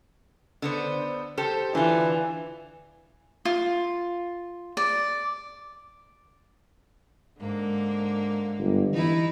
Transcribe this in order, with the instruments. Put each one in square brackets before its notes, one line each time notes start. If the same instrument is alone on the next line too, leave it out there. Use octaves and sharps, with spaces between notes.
[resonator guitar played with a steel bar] D3 B3 C5
G4 A4 C5
[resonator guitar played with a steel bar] D3 F4 [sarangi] E3
[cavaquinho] F4
D5
[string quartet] G#2 D3 A#3
[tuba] G1
[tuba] E3 [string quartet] D#4 E4